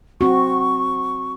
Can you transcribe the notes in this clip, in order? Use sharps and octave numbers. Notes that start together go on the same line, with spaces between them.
C4 F#4 C#6